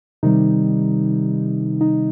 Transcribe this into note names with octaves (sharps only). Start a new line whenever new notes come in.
C3 D#3 G3 D#4
D#4